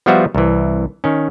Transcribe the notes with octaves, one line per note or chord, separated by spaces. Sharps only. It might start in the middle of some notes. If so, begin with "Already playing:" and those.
F3 G3 B3 F4 F#4 E5
C2 E3
D#3 C#4